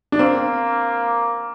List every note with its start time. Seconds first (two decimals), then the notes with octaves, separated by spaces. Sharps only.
0.12 D4
0.19 A#3 C4